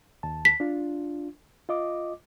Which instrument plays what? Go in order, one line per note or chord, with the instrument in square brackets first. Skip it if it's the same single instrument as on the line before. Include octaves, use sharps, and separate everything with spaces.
[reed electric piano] D#2 A5
[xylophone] B6
[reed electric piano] D4 F4
F4 D#5 D6